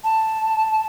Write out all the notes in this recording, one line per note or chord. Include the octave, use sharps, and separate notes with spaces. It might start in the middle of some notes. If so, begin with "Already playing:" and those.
A5